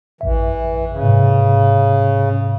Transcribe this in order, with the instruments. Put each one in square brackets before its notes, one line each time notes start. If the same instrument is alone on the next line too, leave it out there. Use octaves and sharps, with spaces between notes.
[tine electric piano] A1 F#2 E5 [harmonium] E3
[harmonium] C#3
[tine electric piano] G#2 C3